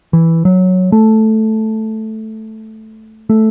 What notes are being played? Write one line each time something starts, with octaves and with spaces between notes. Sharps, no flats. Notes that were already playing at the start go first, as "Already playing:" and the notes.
E3
F#3
A3
A3